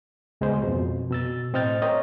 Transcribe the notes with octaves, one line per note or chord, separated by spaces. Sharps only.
C#2 G#3 B3 C5
F2 B2
B2 E6 A6
A2 C4 D#5 F6 G6 A6
C4 A#4 C5 C#5 D#5